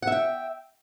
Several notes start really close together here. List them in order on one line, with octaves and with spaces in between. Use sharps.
F#5 E5 G5